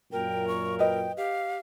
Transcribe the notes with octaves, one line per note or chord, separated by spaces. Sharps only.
F#2 A#2 A#4 G5
C#6
B4 D#5 G5
G4 F5